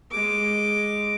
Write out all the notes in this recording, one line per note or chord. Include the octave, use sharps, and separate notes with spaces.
G#3 D6